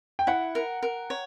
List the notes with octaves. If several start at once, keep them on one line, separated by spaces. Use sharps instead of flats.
G5
E4 F#5
A#4
A#4
C#5